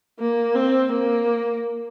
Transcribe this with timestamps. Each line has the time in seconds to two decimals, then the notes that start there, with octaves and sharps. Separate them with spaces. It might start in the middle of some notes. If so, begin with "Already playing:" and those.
0.19 A#3
0.55 C4
0.91 A#3